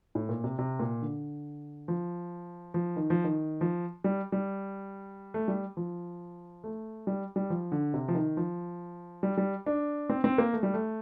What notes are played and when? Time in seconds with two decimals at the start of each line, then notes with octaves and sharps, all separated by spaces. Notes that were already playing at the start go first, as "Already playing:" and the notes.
0.15 A2
0.29 A#2
0.44 C3
0.59 C3
0.79 A#2
1.02 D3
1.88 F3
2.74 F3
2.96 D#3
3.10 F3
3.24 D#3
3.61 F3
4.04 G3
4.32 G3
5.34 A3
5.48 G3
5.77 F3
6.64 A3
7.07 G3
7.36 G3
7.50 F3
7.72 D3
7.94 C3
8.08 F3
8.15 D#3
8.37 F3
9.23 G3
9.37 G3
9.66 D4
10.09 C4
10.24 C4
10.38 A#3
10.53 A3
10.63 G3
10.74 A3